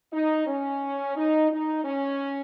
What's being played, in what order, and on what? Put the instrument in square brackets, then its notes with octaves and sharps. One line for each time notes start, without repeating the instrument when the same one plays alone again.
[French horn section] D#4
C#4
D#4
D#4
C#4